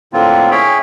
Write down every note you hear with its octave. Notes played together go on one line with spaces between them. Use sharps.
A2 D3 A#3 C4 F4
C#4 E4 G#4 C#5 G5 B5